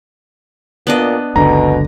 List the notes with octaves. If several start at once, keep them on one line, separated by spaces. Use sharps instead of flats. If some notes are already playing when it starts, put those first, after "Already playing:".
A#2 B3 D4 D#5
F#1 C#2 B2 D3 A#5